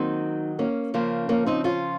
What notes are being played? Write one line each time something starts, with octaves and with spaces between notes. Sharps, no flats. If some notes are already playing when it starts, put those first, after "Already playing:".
Already playing: D#3 F#3 A#3 C4 D#4
A#3 C#4
C#3 F3 A#3
A#3 C#4
C4 D#4
C#4 F4